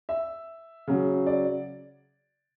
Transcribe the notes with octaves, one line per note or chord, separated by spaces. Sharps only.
E5
C#3 F#3
D5